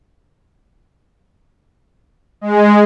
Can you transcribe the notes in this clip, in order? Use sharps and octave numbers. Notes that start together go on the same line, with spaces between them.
G#3